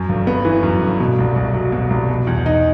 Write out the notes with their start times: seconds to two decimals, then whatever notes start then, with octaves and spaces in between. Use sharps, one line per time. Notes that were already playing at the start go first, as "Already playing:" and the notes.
Already playing: F#2
0.09 G1
0.27 B3
0.45 E3
0.63 F#2
0.82 G1
1.00 B2
1.18 C2
1.36 C2
1.54 F#3
1.72 B2
1.90 C2
2.09 B2
2.27 E2
2.46 D#4